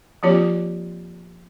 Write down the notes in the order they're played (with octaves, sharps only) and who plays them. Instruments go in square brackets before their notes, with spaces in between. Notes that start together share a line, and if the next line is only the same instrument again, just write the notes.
[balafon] F3 A#3 C4 F4 G4 C#5